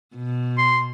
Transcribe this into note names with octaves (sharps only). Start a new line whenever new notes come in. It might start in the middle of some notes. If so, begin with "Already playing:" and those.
B2
C6